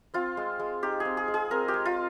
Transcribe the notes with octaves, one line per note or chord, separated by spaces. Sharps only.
C4 F4
G#3
G#3
D#4 G4
C4 G#4
G#4
G#3
G#4
C4 A#4
G4
G#3
F4